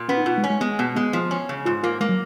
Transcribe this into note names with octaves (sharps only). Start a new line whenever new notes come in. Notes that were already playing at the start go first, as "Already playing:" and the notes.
Already playing: A#2
B3 C#4
D#4
B2 F4
G#3
C#4
G#3
G#3 B3
B2 B3
G#3 B3
F3
C#4
C#3
G#2 F4
A#3 F4
G#3 A#3
F#3